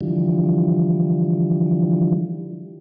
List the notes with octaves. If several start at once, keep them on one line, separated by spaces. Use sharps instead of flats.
D3 E3 F3 G3